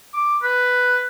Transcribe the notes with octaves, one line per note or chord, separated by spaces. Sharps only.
D6
B4